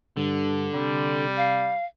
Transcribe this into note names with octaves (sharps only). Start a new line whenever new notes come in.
G2 D3
C3 G3
F5